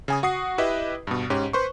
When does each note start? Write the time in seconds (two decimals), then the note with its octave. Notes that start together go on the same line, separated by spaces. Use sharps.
0.08 C#3 G#5 D#6
0.23 F#4 F#5 D#6 C7
0.58 E4 G4 B4 D#5 E5
1.07 G2 B2
1.30 G#2 C#4 G4
1.53 B4 C5 C6 C#6